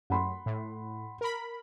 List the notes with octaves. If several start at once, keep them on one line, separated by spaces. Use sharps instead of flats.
F#2 F#5 B5 C6
A2
A#4 B5